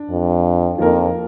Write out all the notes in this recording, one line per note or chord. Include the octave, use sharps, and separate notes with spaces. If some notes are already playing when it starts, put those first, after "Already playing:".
Already playing: D4
F2
F2 F3 A#3 D#4 A#4